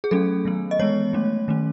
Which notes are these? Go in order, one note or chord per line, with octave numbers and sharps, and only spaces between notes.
G#4
F#3 A3 C#4 A4
D#3 F#3 B3
D#5
E3 G#3 B3 C#5
F#3 A3 C#4
D#3 A3 C#4